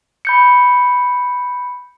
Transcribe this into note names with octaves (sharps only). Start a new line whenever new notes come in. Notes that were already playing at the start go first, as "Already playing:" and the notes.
B5 G6 C#7